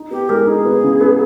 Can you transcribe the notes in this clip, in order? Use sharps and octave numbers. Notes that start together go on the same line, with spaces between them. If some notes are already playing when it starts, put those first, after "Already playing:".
Already playing: D#4
B3 G4
G#3 A#4
D#4 G#4
B3
C#3
B3